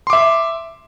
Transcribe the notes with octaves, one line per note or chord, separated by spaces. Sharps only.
E5 C6 D6